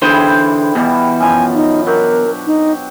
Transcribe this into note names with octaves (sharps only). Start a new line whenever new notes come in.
D3 E3 E4 G#4 C5 G5
E2 B2 E3 G3
F#2 B2 F3 G#5
D#4
F#3 D4 G4 A#4
D#4